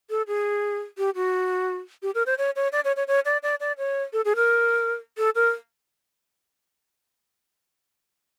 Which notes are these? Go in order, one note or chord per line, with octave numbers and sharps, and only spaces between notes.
A4
G#4
G4
F#4
G4
A#4
C5
C#5
C#5
D5
C#5
C#5
C#5
D5
D5
D5
C#5
A4
G#4
A#4
A4
A#4